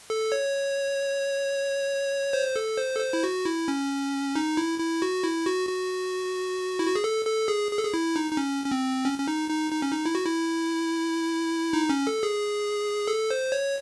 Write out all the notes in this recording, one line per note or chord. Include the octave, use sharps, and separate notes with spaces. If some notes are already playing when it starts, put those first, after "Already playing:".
A4
C#5
C5
A4
C5
A4
C5
E4
F#4
E4
C#4
D#4
E4
E4
F#4
E4
F#4
F#4
E4
F#4
G#4
A4
A4
G#4
G#4
A4
G#4
E4
D#4
D#4
C#4
C#4
C4
C#4
C#4
D#4
D#4
D#4
C#4
D#4
E4
F#4
E4
D#4
C#4
A4
G#4
A4
C5
C#5